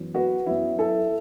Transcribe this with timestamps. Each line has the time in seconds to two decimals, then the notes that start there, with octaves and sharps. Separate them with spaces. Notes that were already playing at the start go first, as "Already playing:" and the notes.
Already playing: F#2 E3 B3
0.15 F#4 B4
0.46 F#2 F#3 B3 E4
0.79 E4 A4